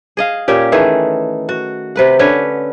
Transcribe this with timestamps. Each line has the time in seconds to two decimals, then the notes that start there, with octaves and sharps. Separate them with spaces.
0.17 G#4 D#5 F5
0.48 A#2 C#4 G4
0.72 D#3 E3 A3 G#4
1.49 F#4
1.96 C3 B4 F#5
2.19 D3 C#4 B4 C#5